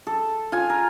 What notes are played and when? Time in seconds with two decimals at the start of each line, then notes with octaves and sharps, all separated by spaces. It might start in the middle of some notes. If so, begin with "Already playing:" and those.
0.07 A4
0.52 F4 G#5
0.70 A#4